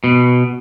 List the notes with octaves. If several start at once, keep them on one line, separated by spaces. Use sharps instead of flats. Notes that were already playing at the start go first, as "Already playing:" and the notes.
B2